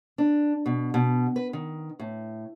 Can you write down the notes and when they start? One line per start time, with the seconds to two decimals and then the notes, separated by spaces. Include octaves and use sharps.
0.18 D4
0.66 B2
0.94 B2
1.36 B4
1.53 D#3
1.99 A2